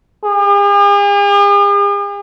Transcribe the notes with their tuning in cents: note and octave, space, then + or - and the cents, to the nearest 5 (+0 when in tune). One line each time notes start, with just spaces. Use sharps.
G#4 -45